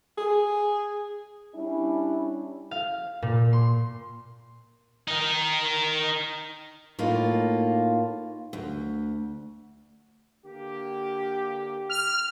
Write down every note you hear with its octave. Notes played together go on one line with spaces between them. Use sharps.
G#4
G3 C#4 D4 E4
F5
A#2
C6
D#4 A#4
A2 A#3 D#4 F4
D2
D3 A#3 G4
F6